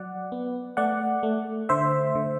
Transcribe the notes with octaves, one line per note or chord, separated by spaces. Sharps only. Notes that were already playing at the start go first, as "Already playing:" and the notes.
Already playing: F#3 D5 F#5
B3
A3 D5 F#5
A3
D3 C5 E5
D3